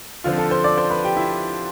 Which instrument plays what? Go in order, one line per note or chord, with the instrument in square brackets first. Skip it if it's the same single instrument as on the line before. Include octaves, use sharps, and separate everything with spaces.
[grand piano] D3 F3 C4 F4 F5
A4 A5
C5 C6
D5 D6
C5 C6
B4 B5
G4 G5
E4 E5